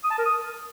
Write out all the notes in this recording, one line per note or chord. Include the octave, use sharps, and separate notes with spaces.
D#6
A5
A#4
D#6